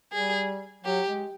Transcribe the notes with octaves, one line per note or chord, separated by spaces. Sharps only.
G3 G#4
F#3 G4
G#3